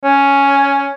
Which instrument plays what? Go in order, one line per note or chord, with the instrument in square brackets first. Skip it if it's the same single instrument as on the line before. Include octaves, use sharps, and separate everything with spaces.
[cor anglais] C#4